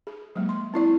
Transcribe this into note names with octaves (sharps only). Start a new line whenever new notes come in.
G#4
F#3 G#3 A#3
C6
C4 E4 D5